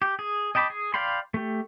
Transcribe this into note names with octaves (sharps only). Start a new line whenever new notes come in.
G4
G#4
D#5 G5 A5 B5 D6
G#4
D5 F5 G5 B5 C6
A3 G4